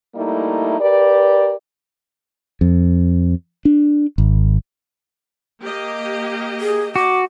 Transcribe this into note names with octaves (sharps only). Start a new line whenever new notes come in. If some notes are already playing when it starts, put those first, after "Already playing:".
G3 A3 A#3 D#4 E4
G4 A#4 B4 D5
F2
D4
G#1
A#3 G4 D#5
G#4
F#4 D6